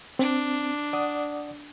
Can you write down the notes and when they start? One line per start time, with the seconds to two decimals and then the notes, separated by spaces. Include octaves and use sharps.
0.19 C4 D4
0.93 D5 F#5 D#6